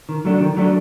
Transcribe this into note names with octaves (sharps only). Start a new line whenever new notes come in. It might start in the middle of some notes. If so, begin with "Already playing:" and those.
D#3
F#3 A3 D4
D#3
F#3 A3 D4